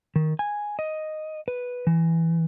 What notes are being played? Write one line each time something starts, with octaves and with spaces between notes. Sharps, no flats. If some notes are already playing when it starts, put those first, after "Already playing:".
D#3
G#5
D#5
B4
E3